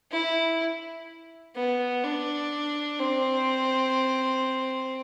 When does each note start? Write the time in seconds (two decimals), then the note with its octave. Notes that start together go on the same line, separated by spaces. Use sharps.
0.11 E4
1.55 B3
2.03 D4
2.99 C4